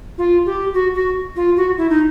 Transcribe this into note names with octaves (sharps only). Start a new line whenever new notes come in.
F4
G4
F#4
F#4
F4
F#4
E4
D#4